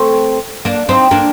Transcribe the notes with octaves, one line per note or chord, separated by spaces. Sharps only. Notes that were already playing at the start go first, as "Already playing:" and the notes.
Already playing: A3 C4
A#3 D4
C4 D#4
A#3 D4